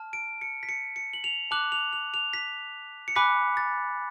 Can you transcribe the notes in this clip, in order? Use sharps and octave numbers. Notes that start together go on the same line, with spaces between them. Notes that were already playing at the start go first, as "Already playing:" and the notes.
Already playing: A5 F6
D7
C#7
B6
C#7
C#7
F#7
F7
A5 D6 F#6 F#7
F7
F7
F7
B6
C#7
G#5 B5 D6 F#6 B6
A6